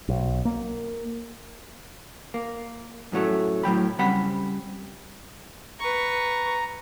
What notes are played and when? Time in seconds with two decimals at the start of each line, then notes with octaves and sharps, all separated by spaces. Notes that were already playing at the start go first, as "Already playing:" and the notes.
0.09 B1
0.45 A#3
2.34 A#3
3.12 F#2 A2 F#3 A3
3.64 A2 F#3 G5 B5
3.99 C#3 G3 C4 F#5 B5
5.80 B4 A#5 C#6